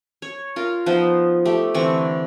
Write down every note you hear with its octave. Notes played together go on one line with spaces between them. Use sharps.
C#5
F4 A#4
F3 B3 D#4 C5
A3 G4
D3 E3 C4 C#6